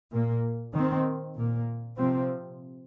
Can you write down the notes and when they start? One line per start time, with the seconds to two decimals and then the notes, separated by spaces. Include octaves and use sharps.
0.11 A#2 A#3
0.73 D#3 C4
1.36 A#2 A#3
1.97 C3 F3 C4